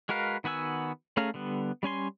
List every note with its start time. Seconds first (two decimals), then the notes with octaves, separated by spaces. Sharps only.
0.09 G#3 F#4 A#4 B4 F5
0.44 D#3 B3 F#4 G#5 E6
1.17 A3 C#4 G#4 F5 A#5
1.34 D3 G3 B3
1.83 G3 C#4 G#5 C6